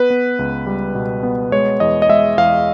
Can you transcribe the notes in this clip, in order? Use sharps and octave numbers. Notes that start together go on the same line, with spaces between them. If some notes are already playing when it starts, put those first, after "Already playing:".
Already playing: B3 B4
B3
C#2
G3
B2
B3
G#3 C#5
E2 D#5
D#5
G#3 E5
E2 F5